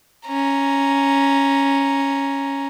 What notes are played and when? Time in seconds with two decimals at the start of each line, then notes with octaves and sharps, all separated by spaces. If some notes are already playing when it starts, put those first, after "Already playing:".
0.28 C#4 A#5